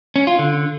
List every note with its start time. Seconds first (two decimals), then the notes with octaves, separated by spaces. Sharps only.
0.16 C#4
0.27 F4
0.39 D3